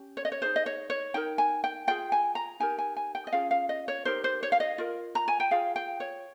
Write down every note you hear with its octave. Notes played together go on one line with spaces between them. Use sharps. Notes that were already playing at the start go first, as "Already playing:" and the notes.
Already playing: C#4 G4
C#5
D#5
C#5
D#4 G#4 C5
D#5
C#5
C#5
D#4 A#4 G5
G#5
G5
F4 G#4 G5
G#5
A#5
D#4 G4 A#4 G#5
G#5
G#5
G5
D#5
C#4 F4 G#4 F5
F5
D#5
C#5
D#4 G4 A#4 C5
C5
C#5
F5
D#5
F4 A#4
A#5
G#5
G5
F4 G#4 F5
G5
C#5